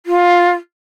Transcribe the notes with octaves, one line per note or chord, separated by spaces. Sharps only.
F4